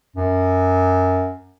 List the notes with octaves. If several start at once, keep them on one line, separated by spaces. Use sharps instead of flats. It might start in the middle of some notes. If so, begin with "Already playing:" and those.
F#2